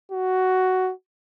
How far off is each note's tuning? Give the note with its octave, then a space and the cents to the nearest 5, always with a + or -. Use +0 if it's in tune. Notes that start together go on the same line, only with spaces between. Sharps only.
F#4 +10